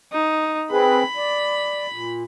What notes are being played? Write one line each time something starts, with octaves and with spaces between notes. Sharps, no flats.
D#4
C4 G#4 B4 B5
D5
A#2